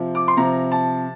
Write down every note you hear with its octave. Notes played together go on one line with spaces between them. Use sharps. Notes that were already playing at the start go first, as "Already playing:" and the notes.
Already playing: C3 F3
D6
C6
C3 F3 A#5
A5